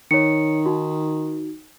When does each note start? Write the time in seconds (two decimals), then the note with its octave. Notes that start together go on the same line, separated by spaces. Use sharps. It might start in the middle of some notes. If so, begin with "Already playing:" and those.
0.11 D#3 C#5 C#7
0.66 D#4 F#4